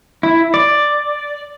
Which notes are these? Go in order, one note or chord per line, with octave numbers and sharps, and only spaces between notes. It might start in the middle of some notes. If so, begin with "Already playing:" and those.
E4
D5